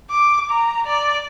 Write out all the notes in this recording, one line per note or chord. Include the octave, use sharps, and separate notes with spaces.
D6
A#5
D5